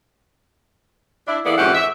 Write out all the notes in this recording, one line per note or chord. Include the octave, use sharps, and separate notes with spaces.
D4 E4
E3 A#3 B3 G#4 A4 D5
F2 G#2 E3 C#4 G4 F#5
E5